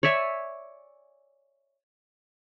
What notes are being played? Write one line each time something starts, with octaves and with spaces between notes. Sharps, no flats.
C#5 D5 E5 G#5